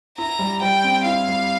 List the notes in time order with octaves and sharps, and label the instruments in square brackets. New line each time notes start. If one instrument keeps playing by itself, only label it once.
[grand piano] E4 [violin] A#5
[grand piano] G3
[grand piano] G3 [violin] G5
[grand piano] C4
[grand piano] E4 [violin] F5
[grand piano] G3